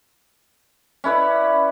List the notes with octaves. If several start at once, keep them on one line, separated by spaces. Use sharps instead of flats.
C#4 E4 B4 D5